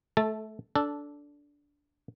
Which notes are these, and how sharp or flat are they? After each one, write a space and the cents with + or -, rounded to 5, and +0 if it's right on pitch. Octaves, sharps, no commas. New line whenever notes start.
A3 -20 A4 +10 A5 +0
D4 -15 A4 +0